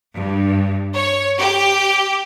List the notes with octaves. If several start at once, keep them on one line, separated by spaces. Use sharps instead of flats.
G2
C#5
G4